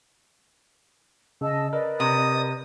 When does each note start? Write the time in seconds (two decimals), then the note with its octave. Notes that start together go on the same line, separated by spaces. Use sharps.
1.41 C#3 D#5 A5 E6
1.73 A#4 B4 D5 D#5
2.00 C3 D#6